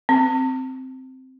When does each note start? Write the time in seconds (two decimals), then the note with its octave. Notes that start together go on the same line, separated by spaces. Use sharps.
0.09 C4